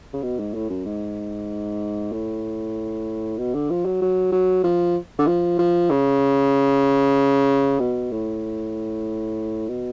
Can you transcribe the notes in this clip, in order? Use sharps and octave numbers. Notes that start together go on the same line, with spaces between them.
C#3
B2
G#2
A2
F#2
G#2
A2
B2
D3
F3
F#3
F#3
F#3
F3
D3
F3
F3
C#3
B2
A2
B2